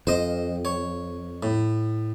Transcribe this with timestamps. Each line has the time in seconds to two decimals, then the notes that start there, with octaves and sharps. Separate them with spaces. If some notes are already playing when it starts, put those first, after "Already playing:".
0.07 F2 C5 D#5
0.65 C#5
1.43 A2